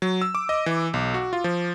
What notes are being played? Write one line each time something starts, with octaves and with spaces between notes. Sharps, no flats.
F#3
E6
D6
D#5
E3
B1
F#4
F4
F3